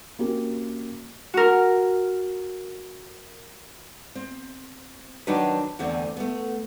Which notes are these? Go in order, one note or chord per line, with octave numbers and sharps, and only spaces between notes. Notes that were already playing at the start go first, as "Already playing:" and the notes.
A#3 C4 C#4 F#4 G4 A#4
F#4 A#4
C4
D#3 F#3 D4 D#4 F#4 B4
E2 D3 E3 A3 C4
A3 B3